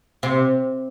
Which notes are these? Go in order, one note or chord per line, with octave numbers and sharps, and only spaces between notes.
C3